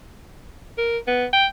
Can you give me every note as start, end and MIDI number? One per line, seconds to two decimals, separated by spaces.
0.78 0.98 70
1.07 1.25 59
1.33 1.46 79